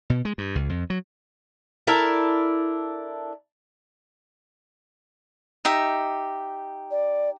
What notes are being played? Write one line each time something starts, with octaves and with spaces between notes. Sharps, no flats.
B2
G#3
G2
C#2
F2
F#3
D4 E4 A4 A#4
D#4 G4 E5
D5